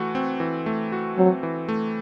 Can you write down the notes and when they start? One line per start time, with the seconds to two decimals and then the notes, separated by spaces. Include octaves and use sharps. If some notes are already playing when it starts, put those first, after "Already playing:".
Already playing: E3 A3 F#4
0.15 C4
0.40 E3
0.66 A3
0.92 F#4
1.17 F#3 C4
1.43 E3
1.69 A3